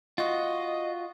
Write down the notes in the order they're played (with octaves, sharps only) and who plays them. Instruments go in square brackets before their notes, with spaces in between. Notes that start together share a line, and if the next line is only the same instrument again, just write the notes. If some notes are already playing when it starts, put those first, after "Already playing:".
[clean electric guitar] F4 F#4 [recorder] D#5